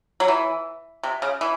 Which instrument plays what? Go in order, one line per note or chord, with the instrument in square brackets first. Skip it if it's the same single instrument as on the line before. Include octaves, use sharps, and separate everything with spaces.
[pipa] F#3
E3
C3
C#3
E3